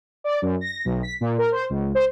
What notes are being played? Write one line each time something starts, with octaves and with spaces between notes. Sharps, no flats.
D5
F#2
A#6
B1
B6
A#2
A#4
C5
C#2
C5